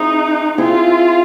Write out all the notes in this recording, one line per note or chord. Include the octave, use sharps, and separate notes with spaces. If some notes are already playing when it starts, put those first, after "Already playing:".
Already playing: C4 D#4 E4 G#4
C4 E4 F4 G#4